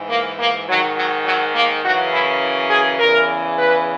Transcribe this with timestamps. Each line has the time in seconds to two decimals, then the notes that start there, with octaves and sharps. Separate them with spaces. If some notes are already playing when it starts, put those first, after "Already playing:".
Already playing: G#2 E3
0.09 A#3
0.38 A#3
0.68 G#2 D#3 F#3
0.97 F#3
1.25 F#3
1.55 A#3
1.83 F#2 C#3 E3 F#4
2.13 E4
2.70 G#4
2.99 E2 C#3 E3 A#4
3.58 B4